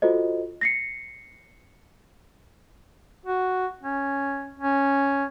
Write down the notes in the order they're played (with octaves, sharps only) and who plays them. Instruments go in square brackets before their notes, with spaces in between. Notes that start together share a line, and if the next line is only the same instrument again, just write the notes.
[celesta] F4 F#4 A4 C5 D#5
A#6 C7 C#7
[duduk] F#4
C#4
C#4